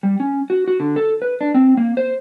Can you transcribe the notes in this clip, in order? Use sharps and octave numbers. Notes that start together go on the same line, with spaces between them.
G3
C#4
F#4
F#4
D3
A4
B4
D4
C4
A#3
C5